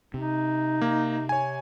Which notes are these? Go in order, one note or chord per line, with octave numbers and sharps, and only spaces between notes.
C3 D#4
A#3
C#5 G#5